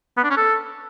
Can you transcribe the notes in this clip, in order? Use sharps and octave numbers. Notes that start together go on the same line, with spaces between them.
B3
D4
C#4
A4